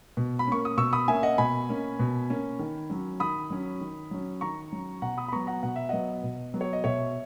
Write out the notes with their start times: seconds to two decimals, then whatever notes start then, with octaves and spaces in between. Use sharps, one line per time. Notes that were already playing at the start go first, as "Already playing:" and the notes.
0.17 B2
0.39 B5
0.47 A#3 C#4 C#6
0.65 D#6
0.77 B2 C#6 E6
0.93 B5 D#6
1.08 A#3 C#4 E5 G#5
1.23 D#5 F#5
1.38 B2 G#5 B5
1.69 A#3 C#4
1.99 B2
2.30 A#3 C#4
2.59 D#3
2.90 F#3 C#4
3.20 D#3 B5 D#6
3.50 F#3 C#4
3.81 D#3
4.11 F#3 C#4
4.41 D#3 A#5 C#6
4.72 F#3 C#4
5.02 B2 F#5 A#5
5.17 B5 D#6
5.28 B5
5.32 F#3 B3 A#5 C#6
5.47 F#5 A#5
5.63 B2 F#5
5.76 E5
5.89 F#3 B3 D#5 F#5
6.23 B2
6.54 F#3 B3
6.61 C#5
6.73 D#5
6.84 B2 C#5 E5